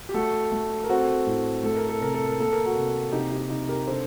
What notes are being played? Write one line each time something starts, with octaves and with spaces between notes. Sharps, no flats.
G4
A3 F#4 A4
A3
A#4
C4 F#4 A4
A2
A3 A4
A#4
A4
C3 A#4
A4
A#4
A#3 A4
A#4
F#4 A4
C3
C3 D#4 G4
D#4 G4
C3 D#4
G4 A#4
D3 A4 C5